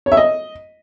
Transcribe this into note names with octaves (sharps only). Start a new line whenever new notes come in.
C#5
E5
D#5